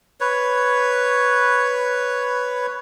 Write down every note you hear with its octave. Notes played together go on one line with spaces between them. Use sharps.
B4 C#5